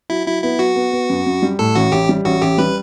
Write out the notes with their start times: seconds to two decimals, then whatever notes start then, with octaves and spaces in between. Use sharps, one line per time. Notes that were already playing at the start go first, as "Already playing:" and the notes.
0.10 F#3 E4
0.26 F#3 E4
0.43 B3 E4
0.59 F#3 F#4
0.76 B3
0.92 B3
1.10 F#2
1.26 F#2
1.42 G3
1.59 A2 A4
1.75 A1 F#4
1.92 A1 G4
2.09 G3
2.25 A1 F#4
2.42 A1 G4
2.58 G3 B4